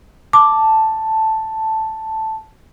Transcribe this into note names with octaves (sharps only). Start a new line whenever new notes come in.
A5 D6